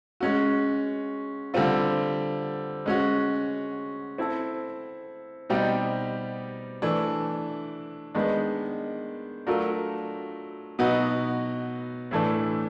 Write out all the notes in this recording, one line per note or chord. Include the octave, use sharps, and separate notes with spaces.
G#3 C#4 F#4
D3 G3 C4 F4
G#3 C#4 F#4
C4 E4 A4
B2 G3 C4 D#4 G4
E3 A3 D4
D#3 G#3 B3 D4
F#3 A3 D4 F4 A#4
B2 F#3 B3 D#4 F#4
A2 E3 A3 D4